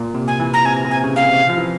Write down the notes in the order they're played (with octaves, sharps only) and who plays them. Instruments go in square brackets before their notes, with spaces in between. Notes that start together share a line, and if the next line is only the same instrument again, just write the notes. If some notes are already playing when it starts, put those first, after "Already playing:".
Already playing: [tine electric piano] A#2
C3
[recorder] G#5
[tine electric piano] E3
[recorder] A#5
[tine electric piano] C3 [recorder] G#5
[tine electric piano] C3
[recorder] G#5
[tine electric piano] C#3
[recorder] F5
[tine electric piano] C3
F3
E3